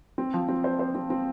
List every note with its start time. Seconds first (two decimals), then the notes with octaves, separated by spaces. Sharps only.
0.18 C4
0.34 F3
0.48 C4
0.64 C5
0.79 C5
0.95 C4
1.10 C4